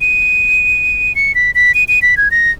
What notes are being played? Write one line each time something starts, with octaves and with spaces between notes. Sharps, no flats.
D#7
C#7
B6
B6
D#7
D#7
B6
G#6
A#6